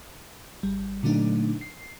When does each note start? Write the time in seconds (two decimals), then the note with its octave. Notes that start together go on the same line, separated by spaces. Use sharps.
0.63 G#1 G3
1.03 A#2 D3 F#3 A3 D4 D#4
1.61 C7